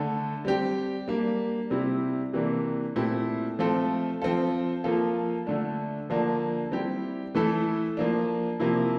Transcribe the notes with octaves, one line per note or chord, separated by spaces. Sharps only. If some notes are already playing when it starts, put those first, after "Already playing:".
Already playing: D3 A3 D4 A4
G3 C4 G4
G3 A#3 D4
C3 G3 C4 E4
C3 E3 A#3 D4
A#2 A3 C4 E4 G4
F3 A3 C4 F4 A4
F3 C4 F4 A4
F3 A#3 F4 A4
D3 A3 D4
D3 F3 A#3 D4 A4
G3 C4 E4 G4
E3 A3 E4 A4
F3 A#3 D4
C3 F3 A#3 E4